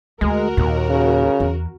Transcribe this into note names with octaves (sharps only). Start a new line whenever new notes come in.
D2 G#3 F#4 A#4
D#2 A#2
C#3
E2